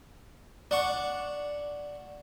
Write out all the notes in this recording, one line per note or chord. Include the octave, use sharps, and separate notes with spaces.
D4 F#5 C#6